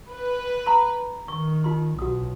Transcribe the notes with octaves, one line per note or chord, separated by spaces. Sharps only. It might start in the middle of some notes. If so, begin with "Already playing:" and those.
B4
A#5 C6
D#3 C#6
D#4 F4 C6
B1 F#4 D#6